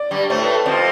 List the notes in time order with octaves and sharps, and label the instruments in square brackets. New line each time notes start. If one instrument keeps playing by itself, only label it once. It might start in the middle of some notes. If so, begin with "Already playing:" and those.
Already playing: [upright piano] D5
[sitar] G2 G3
[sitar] A2 A3 [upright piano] C5
[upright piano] B4
A4
[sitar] F2 F3 [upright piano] C5